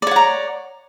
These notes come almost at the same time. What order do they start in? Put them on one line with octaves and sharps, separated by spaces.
D5 C#5 F#5 A#5